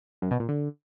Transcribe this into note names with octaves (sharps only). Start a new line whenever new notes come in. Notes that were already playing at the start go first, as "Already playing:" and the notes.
F#2
B2
A#2
D3